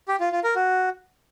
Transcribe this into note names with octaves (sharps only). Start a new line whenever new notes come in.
G4
F4
F4
A#4
F#4